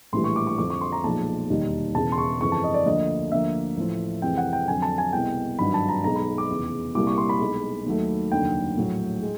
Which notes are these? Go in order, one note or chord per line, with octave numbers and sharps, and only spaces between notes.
A#1 A2 E3 G3 C6
C#6
D6
C#6
F2 D3 F3 D6
C#6
C6
A#5
B1 A#2 F3 G#3 A5
E1 D#2 D#3 G3
E1 E2 C#3 A5
C6
C#6
G1 F2 C#3 E3 G#3 C#6
A5
D#5
D5
D2 D3 F3 A#3 D#5
D2 D3 F3 A#3 E5
A1 A2 F3
F2 C3 E3 G#3 G5
F#5
G5
F2 D3 F#3 G#5
A5
G#5
C2 B2 G#3 G5
G#1 G2 D#3 F#3 B5
A5
A#5
B1 B2 G#3 A#5
B5
D6
F1 E2 C#3
C2 A#2 G3 A#3 D6
C#6
C6
B5
B1 B2 G#3
D#2 D#3 F#3 A3
F1 D#2 D3 F#3 G5
A#1 A2 F#3 A#3
G#3